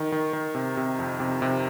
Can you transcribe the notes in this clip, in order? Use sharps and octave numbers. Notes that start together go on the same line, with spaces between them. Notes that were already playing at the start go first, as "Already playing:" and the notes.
Already playing: D#3
D#3
D#3
C3
C3
F2
C3
C3